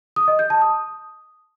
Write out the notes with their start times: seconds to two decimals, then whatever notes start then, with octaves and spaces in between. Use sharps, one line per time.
0.16 D#6
0.28 D#5
0.39 G6
0.50 A5
0.62 D#6